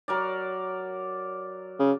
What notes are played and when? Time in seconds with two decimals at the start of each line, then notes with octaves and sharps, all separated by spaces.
0.08 F#3 A#4 D5
1.79 C#3